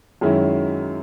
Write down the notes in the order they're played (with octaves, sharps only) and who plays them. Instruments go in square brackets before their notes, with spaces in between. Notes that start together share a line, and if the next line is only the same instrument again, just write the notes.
[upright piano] F#2 D#3 G#3 C#4 E4